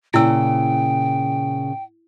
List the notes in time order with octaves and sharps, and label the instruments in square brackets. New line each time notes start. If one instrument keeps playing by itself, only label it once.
[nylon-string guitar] A#2 C#3 [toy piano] E4 E6 [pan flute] G5